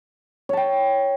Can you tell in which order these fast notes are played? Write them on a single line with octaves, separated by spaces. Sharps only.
C#5 A5 G5